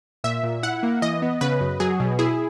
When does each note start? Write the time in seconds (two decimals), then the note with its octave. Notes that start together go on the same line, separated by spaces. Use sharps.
0.24 A#2 E5
0.43 A#2
0.63 E4 F#5
0.83 A#3
1.02 E3 D#5
1.22 B3
1.41 C#3 B4
1.60 F#2
1.80 F#3 G#4
2.00 B2
2.19 E4 G#4